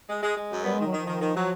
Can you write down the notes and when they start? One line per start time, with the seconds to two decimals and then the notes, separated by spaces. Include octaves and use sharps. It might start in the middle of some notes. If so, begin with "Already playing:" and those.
0.09 G#3
0.23 G#3
0.37 G#3
0.50 F#2
0.64 G3 B3
0.75 G#3
0.80 D#3
0.87 F#3
0.92 D#3 F3
1.07 D#3
1.21 D#3
1.36 F#3